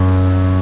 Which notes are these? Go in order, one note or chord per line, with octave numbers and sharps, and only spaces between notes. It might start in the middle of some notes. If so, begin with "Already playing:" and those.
Already playing: F#2